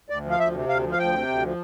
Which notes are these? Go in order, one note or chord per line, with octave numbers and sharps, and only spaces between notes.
D2 D5
F3
F5
D2 E5
C3
D2 F5
F3
F5
D2 G5
C3
D2
F3